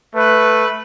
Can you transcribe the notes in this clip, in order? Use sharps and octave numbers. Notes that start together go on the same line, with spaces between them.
A3 B4